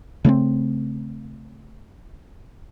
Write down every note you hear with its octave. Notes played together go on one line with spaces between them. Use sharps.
C#3 A3 A#3 C4